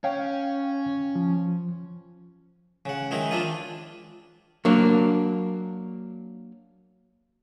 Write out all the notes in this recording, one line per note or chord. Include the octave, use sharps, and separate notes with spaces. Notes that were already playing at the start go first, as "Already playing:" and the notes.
C#4 C#5 F5 G5
F3
C#3 F#5
D#3 G#3 D#4 E4
C4 D4 F4 D#6
F#3 A#3 D4